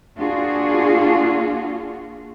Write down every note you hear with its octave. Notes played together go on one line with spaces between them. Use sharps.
A#3 D4 F4 F#4 G#4